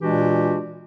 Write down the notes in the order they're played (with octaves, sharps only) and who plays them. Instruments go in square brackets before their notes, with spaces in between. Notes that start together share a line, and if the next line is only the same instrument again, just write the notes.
[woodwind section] A#2 E3 G#3 D4 F#4 G4